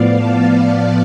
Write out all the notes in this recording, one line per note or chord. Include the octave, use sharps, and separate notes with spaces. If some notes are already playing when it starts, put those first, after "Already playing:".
Already playing: A2 F3 B3 D5 F5
F5 A5